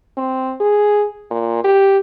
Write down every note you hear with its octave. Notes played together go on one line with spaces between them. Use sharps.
C4
G#4
A#2
G4